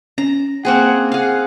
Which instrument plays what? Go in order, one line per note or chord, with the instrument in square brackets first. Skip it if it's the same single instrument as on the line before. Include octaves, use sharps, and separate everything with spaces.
[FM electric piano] C#4 [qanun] A#5
[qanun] A#3 C4 G#4 [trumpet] F#5
[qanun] G#4 F5 [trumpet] F#5